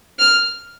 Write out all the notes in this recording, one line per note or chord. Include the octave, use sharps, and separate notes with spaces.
F6